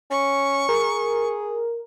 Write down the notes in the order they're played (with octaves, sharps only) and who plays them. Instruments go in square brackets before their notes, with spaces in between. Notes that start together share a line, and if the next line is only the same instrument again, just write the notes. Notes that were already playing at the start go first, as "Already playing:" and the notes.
[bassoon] C#4 [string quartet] C#6
[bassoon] G#4 [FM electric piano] A#4